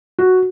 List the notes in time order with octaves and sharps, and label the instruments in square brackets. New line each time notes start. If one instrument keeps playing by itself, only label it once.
[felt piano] F#4